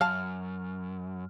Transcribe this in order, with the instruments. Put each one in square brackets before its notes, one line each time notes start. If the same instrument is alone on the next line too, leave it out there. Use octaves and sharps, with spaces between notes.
[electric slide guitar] F#2 [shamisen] F5 A5 [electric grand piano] F6